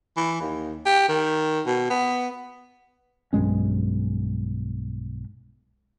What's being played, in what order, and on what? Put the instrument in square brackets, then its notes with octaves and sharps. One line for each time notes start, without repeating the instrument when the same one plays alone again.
[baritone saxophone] E3
D#2
G4
D#3
B2
B3
[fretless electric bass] B1 G2 G#3 C#4